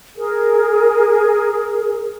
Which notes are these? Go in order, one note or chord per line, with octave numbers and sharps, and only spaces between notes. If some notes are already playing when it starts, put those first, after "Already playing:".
G#4 A#4